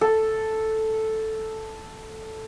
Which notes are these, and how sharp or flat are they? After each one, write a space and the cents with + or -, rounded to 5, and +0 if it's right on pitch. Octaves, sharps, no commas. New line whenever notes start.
A4 +0